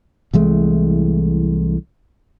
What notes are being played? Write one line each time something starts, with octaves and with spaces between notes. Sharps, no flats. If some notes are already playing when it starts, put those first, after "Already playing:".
C2 E3 G#3 A3